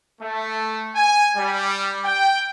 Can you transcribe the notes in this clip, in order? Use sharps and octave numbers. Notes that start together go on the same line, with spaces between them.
A3
G#5
G3
G5